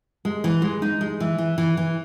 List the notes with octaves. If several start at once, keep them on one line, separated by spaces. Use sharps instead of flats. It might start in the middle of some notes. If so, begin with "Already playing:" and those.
G#3
E3
G#3
D#4
G#3
E3
E3
E3
E3